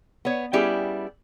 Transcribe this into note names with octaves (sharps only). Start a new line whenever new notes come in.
B3 C#5
G3 B3 C#4 E4 G4 G#4